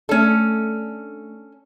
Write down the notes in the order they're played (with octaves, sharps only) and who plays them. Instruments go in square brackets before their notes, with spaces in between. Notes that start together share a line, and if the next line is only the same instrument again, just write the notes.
[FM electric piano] A3 D4 [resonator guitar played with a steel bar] C#4 A4